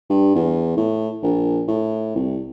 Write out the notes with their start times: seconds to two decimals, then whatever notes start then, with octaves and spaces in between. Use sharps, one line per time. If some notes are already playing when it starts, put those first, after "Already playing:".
0.10 G2
0.35 E2
0.77 A2
1.23 A#1
1.68 A2
2.16 C2